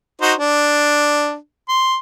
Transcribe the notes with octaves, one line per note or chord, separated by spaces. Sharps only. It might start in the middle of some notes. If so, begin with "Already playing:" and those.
D#4 F#4 C5
D4
C6